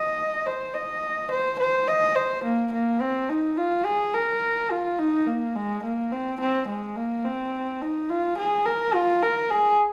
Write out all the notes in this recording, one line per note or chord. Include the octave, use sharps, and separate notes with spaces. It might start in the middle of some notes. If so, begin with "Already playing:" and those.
Already playing: D#5
C5
D#5
C5
C5
D#5
C5
A#3
A#3
C4
D#4
F4
G#4
A#4
F4
D#4
A#3
G#3
A#3
C4
C4
G#3
A#3
C4
D#4
F4
G#4
A#4
F4
A#4
G#4